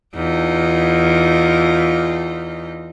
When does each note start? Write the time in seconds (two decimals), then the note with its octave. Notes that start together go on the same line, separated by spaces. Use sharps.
0.14 E2 D#4 F4